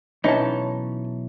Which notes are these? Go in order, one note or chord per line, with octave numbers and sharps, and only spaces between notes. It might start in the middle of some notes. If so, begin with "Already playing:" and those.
B1 E3 C#4 D#4 C#5 A5